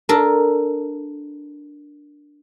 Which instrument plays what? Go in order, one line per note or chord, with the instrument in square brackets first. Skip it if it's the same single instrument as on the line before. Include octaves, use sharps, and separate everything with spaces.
[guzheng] D4 A4 A#4